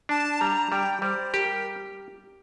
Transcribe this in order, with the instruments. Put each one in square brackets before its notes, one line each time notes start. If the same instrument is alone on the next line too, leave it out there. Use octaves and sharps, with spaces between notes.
[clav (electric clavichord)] D4 [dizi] A5
[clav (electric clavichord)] G3 [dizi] A#5
[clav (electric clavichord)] G3 [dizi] G5
[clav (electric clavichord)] G3 [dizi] C5
[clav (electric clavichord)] G4 [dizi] A#4